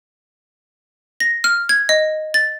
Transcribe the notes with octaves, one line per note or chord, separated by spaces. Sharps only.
A#6
F6
G#6
D#5
A6